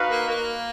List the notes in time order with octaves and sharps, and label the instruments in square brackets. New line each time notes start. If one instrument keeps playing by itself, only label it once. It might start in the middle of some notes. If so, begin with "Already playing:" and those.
Already playing: [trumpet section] D#4 F#4 B4 F5
[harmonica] A#3
A#3